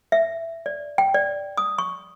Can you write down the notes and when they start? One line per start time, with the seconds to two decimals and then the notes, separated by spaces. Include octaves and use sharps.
0.12 E5
0.66 D5
0.98 G5
1.14 D5
1.57 D#6
1.78 C#6